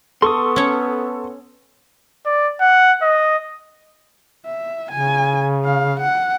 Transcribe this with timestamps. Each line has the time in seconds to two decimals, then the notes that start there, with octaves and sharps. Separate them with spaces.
0.22 B3 A4 C6 C#6 D#6
0.56 C#4 C#5
2.26 D5
2.61 F#5
3.02 D#5
4.46 E5
4.91 C#3 G#5
5.64 F5
6.00 F#5